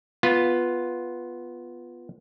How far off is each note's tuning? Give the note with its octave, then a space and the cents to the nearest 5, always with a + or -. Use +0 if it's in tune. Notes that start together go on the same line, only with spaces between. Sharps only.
B3 -5 F4 +0